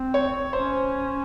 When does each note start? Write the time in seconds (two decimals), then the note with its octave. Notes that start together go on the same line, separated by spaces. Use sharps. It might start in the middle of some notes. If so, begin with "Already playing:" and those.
Already playing: C4
0.14 C#5
0.53 C#4 C5